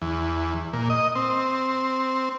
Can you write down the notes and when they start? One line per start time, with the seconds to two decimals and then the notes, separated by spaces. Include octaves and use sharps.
0.02 E2
0.73 A#2
0.90 D#5
1.15 C4